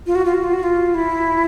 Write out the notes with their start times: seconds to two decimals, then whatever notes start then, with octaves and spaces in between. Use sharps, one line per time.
0.06 F4
0.15 F#4
0.25 F4
0.34 F#4
0.44 F4
0.53 F#4
0.63 F4
0.94 E4